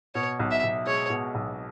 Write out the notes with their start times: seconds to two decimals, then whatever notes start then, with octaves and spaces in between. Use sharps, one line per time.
0.15 B2 C#5
0.39 B1
0.51 E5
0.63 B1
0.86 G#3 C#5
1.10 B2
1.35 B1